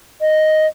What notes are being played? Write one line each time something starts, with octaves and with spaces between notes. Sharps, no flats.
D#5